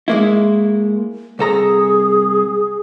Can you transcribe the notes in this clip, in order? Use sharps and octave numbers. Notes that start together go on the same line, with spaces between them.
G#3 A#3 E4
C2 G#4 A4 A#5